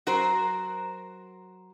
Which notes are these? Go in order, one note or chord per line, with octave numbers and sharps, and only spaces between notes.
F#3 F#4 A#4 C5